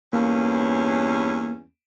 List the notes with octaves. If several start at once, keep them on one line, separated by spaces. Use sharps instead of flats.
E2 G2 A#3 C#4